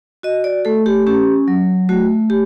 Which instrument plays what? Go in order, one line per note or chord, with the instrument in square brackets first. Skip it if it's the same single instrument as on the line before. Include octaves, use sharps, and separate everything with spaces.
[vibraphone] F#4 D#5
D5
A3 A4
G4
C#4 G4
F#3
A3 F#4
G4